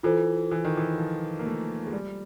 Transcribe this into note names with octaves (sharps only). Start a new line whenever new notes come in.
E3 F4 A4 C5
E3
D#3
E3
F3
A#3
A3
G#3
G3